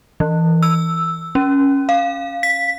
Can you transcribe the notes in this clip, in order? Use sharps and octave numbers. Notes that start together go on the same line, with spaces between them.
E3
E6
C#4
F5
B6